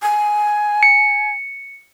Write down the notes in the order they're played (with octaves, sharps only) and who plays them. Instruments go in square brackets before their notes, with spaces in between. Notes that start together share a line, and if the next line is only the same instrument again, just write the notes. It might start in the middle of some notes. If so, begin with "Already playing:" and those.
[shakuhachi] G#5
[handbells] C#7